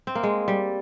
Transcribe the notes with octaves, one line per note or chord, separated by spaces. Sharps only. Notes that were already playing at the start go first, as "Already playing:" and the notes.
C4
A#3
G#3
G3